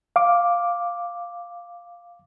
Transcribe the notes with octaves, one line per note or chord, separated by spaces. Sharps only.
F5 D6